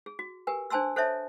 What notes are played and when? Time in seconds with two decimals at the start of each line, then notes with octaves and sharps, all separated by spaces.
0.06 G#4
0.19 F#4
0.47 G4 A#4 B4 G#5
0.70 D4 C5 G#5 A5 C6 E6
0.96 A4 C5 C#5 E5 A5